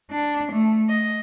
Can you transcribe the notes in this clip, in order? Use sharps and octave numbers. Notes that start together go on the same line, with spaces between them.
D4
A3
D#5